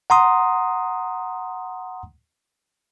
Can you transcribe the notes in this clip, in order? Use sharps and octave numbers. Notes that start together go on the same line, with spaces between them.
F#5 A#5 C6 D#6